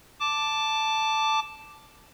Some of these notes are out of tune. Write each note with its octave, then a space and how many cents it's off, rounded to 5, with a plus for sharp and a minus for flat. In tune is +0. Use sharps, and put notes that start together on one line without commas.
A5 +0 D6 +0